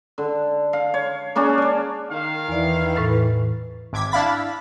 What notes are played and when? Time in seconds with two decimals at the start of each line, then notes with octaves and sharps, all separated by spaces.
0.18 D3
0.73 F5
0.94 C#5
1.36 A#3 C#4 D4 G#4
1.58 C#5 D5
2.10 D#3 F5
2.48 E2 E3 D5
2.96 A2 B4 A6
3.93 G#1 D6 G#6 B6
4.11 D4 E4 F5 B5 A6 B6